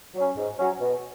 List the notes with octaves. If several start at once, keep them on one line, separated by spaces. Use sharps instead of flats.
F#3 C#4
G#2
F#3 C#4
B2